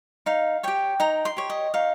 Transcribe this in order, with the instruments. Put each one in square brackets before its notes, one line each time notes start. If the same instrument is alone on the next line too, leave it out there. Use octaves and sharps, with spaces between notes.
[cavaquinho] D#4 F5
G4 C#5 G5
D#4 A#5
C6
G4 C#5
D#5
D#4 F5